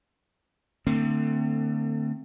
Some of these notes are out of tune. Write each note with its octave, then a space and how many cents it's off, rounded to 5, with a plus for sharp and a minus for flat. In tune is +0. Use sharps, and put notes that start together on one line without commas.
D3 +30 A3 +45 C4 +0